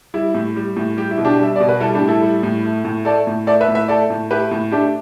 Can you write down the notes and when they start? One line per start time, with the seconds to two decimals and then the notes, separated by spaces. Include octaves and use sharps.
0.14 G3 E4
0.34 A2
0.56 G3
0.76 A2
0.97 G3 G4
1.11 E4
1.18 B2
1.25 D4 G4
1.39 G3 E5
1.56 B2 D5
1.69 B4
1.80 G3 E4 A4
1.95 D4 G4
2.01 A2
2.08 E4 A4
2.22 G3
2.43 A2
2.65 A3
2.84 A2
3.05 A3 A4 D5
3.27 A2
3.47 A3 A4 D5
3.61 B4 E5
3.68 A2
3.75 B4 E5
3.88 A3 A4 D5
4.10 A2
4.30 A3 G4 B4
4.51 A2
4.71 A3 D4 G4